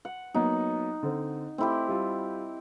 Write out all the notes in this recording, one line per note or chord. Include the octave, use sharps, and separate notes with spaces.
F#5
F#3 A#3 B3 D#4
D3 C4
A3 C4 E4 G4
G3 F4